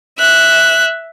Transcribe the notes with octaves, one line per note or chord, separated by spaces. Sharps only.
E5 F#6